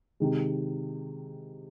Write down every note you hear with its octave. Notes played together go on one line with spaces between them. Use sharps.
C3 D#3 G#3